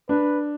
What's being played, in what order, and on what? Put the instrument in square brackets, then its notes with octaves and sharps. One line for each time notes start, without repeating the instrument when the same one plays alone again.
[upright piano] D4 [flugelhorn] B4